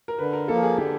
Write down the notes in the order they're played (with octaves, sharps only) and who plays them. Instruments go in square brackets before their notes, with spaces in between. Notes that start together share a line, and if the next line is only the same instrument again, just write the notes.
[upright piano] A#4
[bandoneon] D3 [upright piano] B4
[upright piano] A#4
[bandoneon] F3 A#3 [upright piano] A4
[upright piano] G#4
[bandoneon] D3 [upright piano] G4